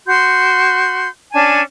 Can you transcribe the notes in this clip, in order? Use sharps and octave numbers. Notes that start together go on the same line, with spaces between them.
F#4 C6 G6
C#4 D4 G#5 A5